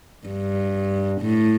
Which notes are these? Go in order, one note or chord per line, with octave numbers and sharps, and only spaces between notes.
G2
A2